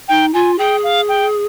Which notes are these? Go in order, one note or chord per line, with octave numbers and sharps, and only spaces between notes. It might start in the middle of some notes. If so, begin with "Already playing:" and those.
D#4 G5
F4 G#5
G#4 G5
F5
G5